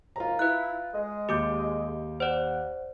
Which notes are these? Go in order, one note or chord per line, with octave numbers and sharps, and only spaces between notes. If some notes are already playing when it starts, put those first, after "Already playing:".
D#2 G#2 F4 A#5
E4 B4 F#6
G#3 D#5
D#2 G4 D6 G6
C5 D5 F#5